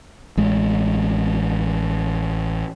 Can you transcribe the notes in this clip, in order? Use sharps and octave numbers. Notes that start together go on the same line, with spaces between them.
A1 G#3